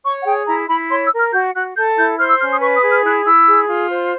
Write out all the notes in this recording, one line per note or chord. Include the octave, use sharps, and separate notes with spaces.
C#5 C#6
F#5
G#4 G5
E4 A#5
E4 B5
C#5 C6
E6
A#4
F6
F#4 G6
F#4 F#6
A4 G6
E4 G6
C5 F6
E6
C#4 F6
D#6
B4 C#6
D#6
G#4
F6
E4 F#6
E4 E6
G#4
F4
C5